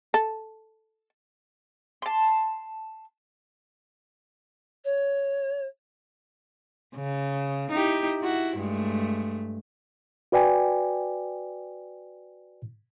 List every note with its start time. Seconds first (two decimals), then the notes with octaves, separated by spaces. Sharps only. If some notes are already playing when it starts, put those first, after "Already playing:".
0.14 A4
2.02 A5 C6
4.84 C#5
6.95 C#3
7.71 D#4 E4 G4
8.20 E4 F#4
8.58 G2 G#3 A3
10.32 F#4 B4 D5 G5 G#5